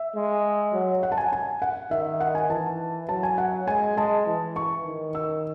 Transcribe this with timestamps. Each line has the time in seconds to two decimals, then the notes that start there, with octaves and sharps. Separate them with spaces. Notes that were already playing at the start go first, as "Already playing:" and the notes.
Already playing: E5
0.15 G#3
0.73 F#3
1.03 F#5
1.12 A5
1.18 G#5
1.33 G#5
1.62 F#5
1.91 D#3 E5
2.20 F#5
2.35 G#5
2.50 E3 A5
3.09 F#3 A5
3.23 G#5
3.38 F#5
3.67 G#3 G#5
3.96 G#3 A5
4.26 E3
4.56 C#6
4.85 D#3
5.15 E6